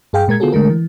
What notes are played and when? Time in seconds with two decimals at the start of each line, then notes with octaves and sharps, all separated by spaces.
0.13 G2 G#4 F5 G5
0.28 A#2 G#3 A#4 G#6
0.40 D3 B3 F4 F#4 G#4 A4
0.52 D3 G#3 A3 A#4
0.70 E3